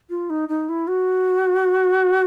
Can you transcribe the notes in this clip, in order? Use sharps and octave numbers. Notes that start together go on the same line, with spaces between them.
F4
D#4
D#4
E4
F#4